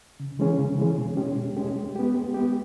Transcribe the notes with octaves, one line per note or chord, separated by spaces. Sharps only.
C#3
E3 G#3 C#4 G#4
C#3
E3 G#3 C#4 G#4
B2
G#3 C#4 G4
B2
G#3 C#4 G4
G#3
B3 G4
G#3
B3 G4